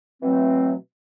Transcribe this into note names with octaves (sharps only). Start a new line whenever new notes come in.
B2 E3 F#3 A3 C4